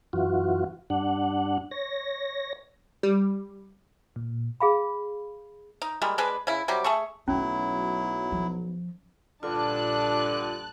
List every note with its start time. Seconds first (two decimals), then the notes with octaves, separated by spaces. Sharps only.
0.13 F#2 E3 F4 F#4
0.90 G2 D4 F#5
1.71 C#5 A#6
3.03 G3
4.16 A#2
4.60 G#4 F5 B5
5.82 D#4
6.02 G3 G#3 A#3
6.18 G#3 D4 G#4 B4
6.47 C#3 E4
6.68 C3 F#3 G3 G4
6.84 A3 G#4 A4 C#6
7.28 B1 F#3 A3 C#4 D4 E4
8.32 F3
9.43 A#1 G2 D3 D4 F4 A5 F#6